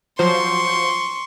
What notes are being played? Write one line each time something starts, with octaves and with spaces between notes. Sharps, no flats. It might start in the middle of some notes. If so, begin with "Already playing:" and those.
F3 F#3 C5 C6 C#6